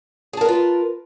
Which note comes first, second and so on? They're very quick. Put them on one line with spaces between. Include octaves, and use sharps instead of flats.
G#4 A5 A#4 B4 F4